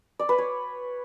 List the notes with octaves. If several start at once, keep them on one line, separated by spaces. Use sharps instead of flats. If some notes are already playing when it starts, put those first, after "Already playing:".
D5
B4
C#5